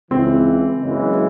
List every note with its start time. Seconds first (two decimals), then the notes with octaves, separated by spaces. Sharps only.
0.10 C#2 C#3 E3 C4
0.81 F#1 F#2 C#3 E3 G#3